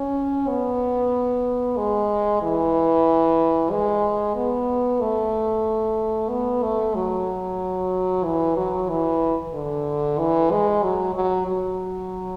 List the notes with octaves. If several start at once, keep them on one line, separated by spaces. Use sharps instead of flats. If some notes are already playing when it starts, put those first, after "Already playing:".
Already playing: C#4
B3
G#3
E3
G#3
B3
A3
B3
A3
F#3
E3
F#3
E3
D3
E3
G#3
F#3
F#3
F#3